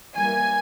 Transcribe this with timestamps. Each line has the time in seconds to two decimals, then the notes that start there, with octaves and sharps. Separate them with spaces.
0.15 E3 G3 A#3 G#5